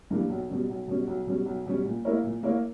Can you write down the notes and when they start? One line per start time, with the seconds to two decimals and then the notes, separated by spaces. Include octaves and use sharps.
0.10 G2 E3 A#3
0.30 B1
0.49 B2 G3 C#4
0.69 B1
0.88 B2 G3 C#4
1.07 B1
1.27 B2 G3 C#4
1.46 B1
1.66 B2 G3 C#4
1.85 A#2
2.05 A#3 E4 A#4 C#5
2.24 A#2
2.43 A#3 E4 A#4 C#5